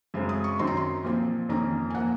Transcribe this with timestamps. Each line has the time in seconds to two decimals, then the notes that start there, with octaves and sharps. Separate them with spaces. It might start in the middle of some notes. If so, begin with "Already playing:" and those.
0.14 F#2 C#3 G#3 C4
0.29 D#6
0.44 C#6
0.59 F#2 D#3 F#3 C4 D#4 C6
0.67 A#5
0.77 C6
1.04 A#2 F3 C4
1.49 F2 D#3 A#3 C#4 A#5
1.90 G#5
1.94 A#2 F3 A#3 F#5